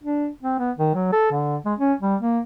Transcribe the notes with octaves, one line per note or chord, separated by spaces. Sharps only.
D4
C4
B3
D#3
F#3
A4
D3
G#3
C#4
G3
A#3